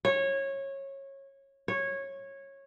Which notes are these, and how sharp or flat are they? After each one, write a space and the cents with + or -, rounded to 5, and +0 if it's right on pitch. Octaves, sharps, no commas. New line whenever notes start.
C#5 -20
C#5 -15